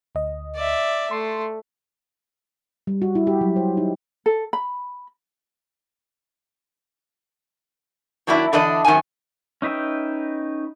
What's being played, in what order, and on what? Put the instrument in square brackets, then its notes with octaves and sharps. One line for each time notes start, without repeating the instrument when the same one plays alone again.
[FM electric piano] D2 D#5
[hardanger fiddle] D5 E5
[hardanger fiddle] A3 [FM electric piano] C6 C7
[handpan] G3
F#4
E4
G4
F#3
C5
D#4
[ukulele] A4
B5
[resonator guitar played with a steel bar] D#3 F#3 A#3 D4 E4 D5
D3 E3 D4 D5 D#5
F#2 D#3 C4 F#5 G#5
[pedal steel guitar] C#4 D#4 B4 E5 G5